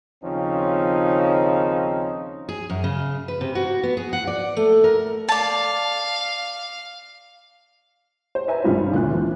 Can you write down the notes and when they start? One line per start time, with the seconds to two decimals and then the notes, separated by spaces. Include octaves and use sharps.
0.24 D#2 C#3 F3 C4 C#4 D#4
2.49 G#4
2.70 F#2
2.84 C#3
3.28 B4
3.41 C3
3.55 F#4
3.83 B3
3.97 G#4
4.13 F#5
4.27 D5
4.57 A3
4.84 A#4
5.29 D5 F5 A5
8.35 C5
8.48 B4 E5 G#5 A#5
8.64 G#1 G2 D#3 G3 F4 C5
8.94 D2 A#2 F#6
9.10 E3 F3